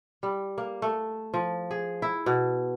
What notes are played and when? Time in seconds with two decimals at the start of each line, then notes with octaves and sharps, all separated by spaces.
0.23 G3
0.58 A#3
0.82 A3
1.34 F3
1.71 G#4
2.02 E4
2.26 B2